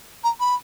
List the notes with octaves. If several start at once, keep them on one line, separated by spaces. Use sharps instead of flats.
A#5
B5